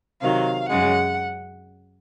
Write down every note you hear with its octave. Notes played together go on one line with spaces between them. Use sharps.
C3 D#3 F#3 F5
F#2 C#3 G#3 F#5